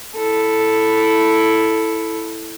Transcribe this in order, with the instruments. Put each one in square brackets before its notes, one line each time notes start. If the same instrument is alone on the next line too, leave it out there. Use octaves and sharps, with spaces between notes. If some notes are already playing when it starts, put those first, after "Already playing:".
[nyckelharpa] E4 A4